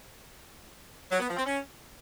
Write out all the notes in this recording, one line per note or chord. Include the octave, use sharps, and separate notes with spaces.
F#3
B3
F3
C4
C#4